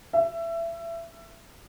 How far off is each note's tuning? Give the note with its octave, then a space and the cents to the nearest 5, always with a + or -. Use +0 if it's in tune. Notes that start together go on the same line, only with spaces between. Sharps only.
E5 +25